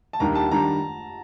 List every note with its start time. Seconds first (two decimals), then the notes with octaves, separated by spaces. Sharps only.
0.13 A5
0.20 D#2 D#3 G3 D4 A#5
0.35 A5
0.51 D#3 G3 D4 A#5